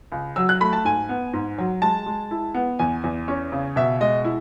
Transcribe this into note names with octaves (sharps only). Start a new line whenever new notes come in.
C#2
F#3 E6
F#6
A3 B5
A5
G#2 G#5
B3
G#2
F#3
G#3 A5
G#3
E4
B3
E2 G#5
E2
C#4
C#3
B2 E5
G#3 D#5
E4